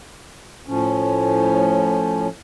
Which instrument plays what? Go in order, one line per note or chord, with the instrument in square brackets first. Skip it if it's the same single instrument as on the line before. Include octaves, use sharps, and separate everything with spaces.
[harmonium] A2 F3 C#4